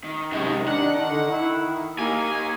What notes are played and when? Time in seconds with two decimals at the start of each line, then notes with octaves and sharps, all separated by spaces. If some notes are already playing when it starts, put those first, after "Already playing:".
0.04 D#3
0.32 F#2 C3 G#3
0.68 D4 F#5
1.08 D3
1.30 E4
1.99 A#3 D#4 G4 G#5